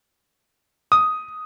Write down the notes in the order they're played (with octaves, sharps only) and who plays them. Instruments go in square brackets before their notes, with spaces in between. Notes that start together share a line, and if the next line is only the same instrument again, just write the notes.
[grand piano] D#6